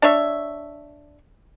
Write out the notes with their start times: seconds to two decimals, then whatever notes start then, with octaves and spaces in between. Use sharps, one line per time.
0.02 D4 C#5 E5